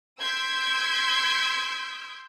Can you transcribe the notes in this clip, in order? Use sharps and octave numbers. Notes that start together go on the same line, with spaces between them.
C6 E6 G6 G#6 B6 D7